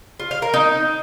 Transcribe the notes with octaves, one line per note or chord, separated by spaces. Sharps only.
F4
F5
A#4
D#4